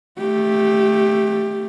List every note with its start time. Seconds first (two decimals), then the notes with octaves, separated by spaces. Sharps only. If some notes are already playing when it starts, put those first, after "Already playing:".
0.19 A3 G4